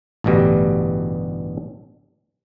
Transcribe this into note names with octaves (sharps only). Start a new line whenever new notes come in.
A1 D2 G2 B2 G3